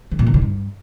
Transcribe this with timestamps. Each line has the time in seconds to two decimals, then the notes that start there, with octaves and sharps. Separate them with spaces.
0.11 D#3
0.19 A#2
0.27 D3
0.34 C3
0.42 G2